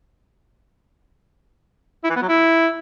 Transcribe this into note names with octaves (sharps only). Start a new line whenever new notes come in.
E4
E3
B3
F#3
E4